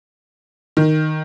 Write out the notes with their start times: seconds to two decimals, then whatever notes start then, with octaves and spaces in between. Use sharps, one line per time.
0.77 D#3